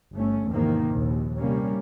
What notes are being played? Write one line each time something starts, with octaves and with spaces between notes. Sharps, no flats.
G1 A3 C#4
E2 G#2 C3 D#3 F3 A#3
A#1 D#2
C3 G3 A#3 C#4